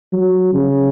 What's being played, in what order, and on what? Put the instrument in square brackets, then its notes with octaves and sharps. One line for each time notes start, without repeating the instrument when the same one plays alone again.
[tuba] F#3
C#3